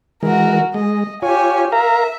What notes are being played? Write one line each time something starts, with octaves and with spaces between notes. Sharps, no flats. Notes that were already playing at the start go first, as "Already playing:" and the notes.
E3 G#3 F#4 A#4
G#3 D#5
F4 G4 C#5 G#5
A#4 E5 F5 A#5